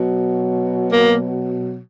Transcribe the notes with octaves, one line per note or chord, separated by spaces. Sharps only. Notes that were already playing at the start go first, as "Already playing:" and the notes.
Already playing: B2 F#3
A#3